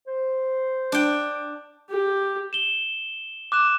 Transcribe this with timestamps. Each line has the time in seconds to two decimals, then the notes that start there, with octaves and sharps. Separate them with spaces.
0.07 C5
0.92 D4 G5
1.90 G4
2.53 E7 G7
3.52 D6 F#6 E7